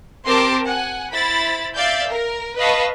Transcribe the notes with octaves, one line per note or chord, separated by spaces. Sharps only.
C4 G4 A#4 A5 C6 D6
F#5 G#5
E4 C5 B5 A6
D5 E5 F5 G6 A6
A#4
B4 D#5 F5 A5 C#6